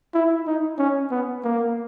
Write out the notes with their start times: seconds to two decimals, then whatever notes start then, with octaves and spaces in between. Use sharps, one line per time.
0.14 E4
0.47 D#4
0.79 C#4
1.11 B3
1.44 A#3